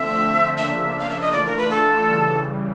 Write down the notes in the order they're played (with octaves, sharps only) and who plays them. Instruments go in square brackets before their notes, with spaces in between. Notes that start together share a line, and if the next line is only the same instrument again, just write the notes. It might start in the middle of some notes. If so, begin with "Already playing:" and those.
Already playing: [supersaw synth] D3 F3 A3 C4 [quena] E5
[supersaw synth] C#3 F3 A#3 D4 [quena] E5
[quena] F5
E5
D#5
[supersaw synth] E3 A3 D4 F4 [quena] D5
[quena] A#4
B4
A4
[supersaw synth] C#3 E3 G3